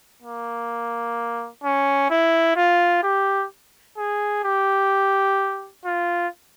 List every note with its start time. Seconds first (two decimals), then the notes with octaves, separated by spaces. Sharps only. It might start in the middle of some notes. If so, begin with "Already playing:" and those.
0.23 A#3
1.64 C#4
2.10 E4
2.57 F4
3.03 G4
3.98 G#4
4.44 G4
5.85 F4